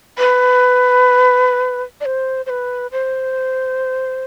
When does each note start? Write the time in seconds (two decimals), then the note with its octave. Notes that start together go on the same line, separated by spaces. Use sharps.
0.19 B4
2.01 D5
2.05 C5
2.46 C5
2.50 B4
2.92 C5